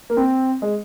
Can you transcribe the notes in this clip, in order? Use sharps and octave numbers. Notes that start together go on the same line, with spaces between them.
A#3
C4
G#3